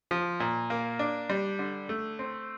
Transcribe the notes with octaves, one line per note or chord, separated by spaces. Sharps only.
F3
A#2
A#3
D4
G3
D3
A3
C4